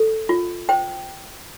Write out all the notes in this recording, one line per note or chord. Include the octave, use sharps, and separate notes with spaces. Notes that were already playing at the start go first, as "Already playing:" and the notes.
Already playing: A4
F4
C5 G5